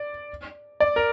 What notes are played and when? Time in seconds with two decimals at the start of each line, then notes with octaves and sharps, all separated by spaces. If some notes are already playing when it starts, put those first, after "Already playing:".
Already playing: D5
0.80 D5
0.96 A#4